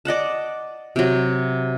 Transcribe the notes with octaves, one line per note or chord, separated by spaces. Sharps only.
D5 D#5 F#5 A5
C3 F#3